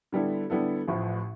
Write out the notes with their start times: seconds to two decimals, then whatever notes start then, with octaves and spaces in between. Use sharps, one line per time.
0.12 D3 G3 B3 E4 A4
0.50 D3 G3 B3 E4 A4
0.88 A1 A2 F3